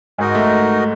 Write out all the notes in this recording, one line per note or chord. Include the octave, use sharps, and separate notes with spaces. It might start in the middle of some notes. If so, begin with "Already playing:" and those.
G#2 G#3 D#4 F#4 A#4 D#5
A3